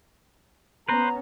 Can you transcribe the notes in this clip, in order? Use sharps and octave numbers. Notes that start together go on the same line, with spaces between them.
B3 C#4 B4 C5 A#5